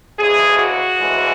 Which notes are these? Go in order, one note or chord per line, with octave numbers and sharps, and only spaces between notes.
D2 C#3 E3 G#3 G#4
F#4
D2 C#3 E3 G#3